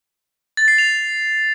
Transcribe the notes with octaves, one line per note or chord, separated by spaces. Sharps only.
A6
C7
F7